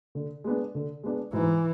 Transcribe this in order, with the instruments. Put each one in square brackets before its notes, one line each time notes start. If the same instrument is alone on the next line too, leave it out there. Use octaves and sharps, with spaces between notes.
[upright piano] D3
G#3 B3 D4
D3
G#3 B3 D4
[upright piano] G#2 [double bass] E3